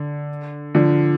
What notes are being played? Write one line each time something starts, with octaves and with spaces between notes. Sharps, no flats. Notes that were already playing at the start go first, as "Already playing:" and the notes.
Already playing: D3
D3 F3